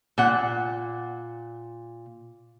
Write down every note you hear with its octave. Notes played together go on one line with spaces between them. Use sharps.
A#2 F#5